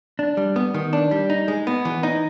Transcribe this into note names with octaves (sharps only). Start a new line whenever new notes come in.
D4
G3
B3
D#3
D4
G3
D#4
G#3
B3
E3
D#4